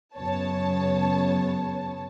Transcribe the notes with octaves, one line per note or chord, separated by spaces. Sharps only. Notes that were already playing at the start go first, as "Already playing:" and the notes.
F#2 C#3 B3 C#5 A5